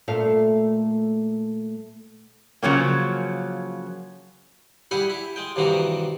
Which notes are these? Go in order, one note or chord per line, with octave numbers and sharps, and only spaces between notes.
A#2 A3 F5
C#3 F3 F#3 A#3
G3 E4 G4 G#4 F#5
E4
G#3 G5
G2 C3 D#3 E3 F#4